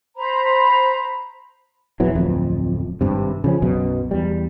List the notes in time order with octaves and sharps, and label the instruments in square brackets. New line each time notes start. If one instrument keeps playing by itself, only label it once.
[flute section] C5 A#5 B5
[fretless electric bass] A#1 E2 E3 F#3
D1 F2
G#1 G2 C3
C#3 F3 C#4
B1 F#2 B2
E2 G3